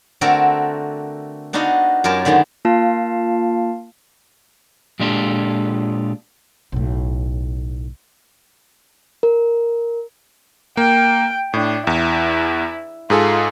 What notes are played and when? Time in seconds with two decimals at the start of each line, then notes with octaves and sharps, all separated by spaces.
0.21 D3 A3 C4 F#4 A4 A#4
1.53 B3 D4 D#4 F#4 D#5 F5
2.04 F#2 C#4 F4 G4 A#4 A5
2.25 D3 D#3 G#3 A3 B3
2.65 A#3 F4 F5 A5
5.00 A#2 G#3 D4 F4 G4 A4
6.72 B1 A2
9.23 A#4
10.77 A#3 G5
11.54 A2 D4
11.87 E2 E4
13.10 G#2 F4 G#4 A4